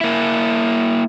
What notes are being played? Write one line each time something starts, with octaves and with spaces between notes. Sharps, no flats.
A#3 E4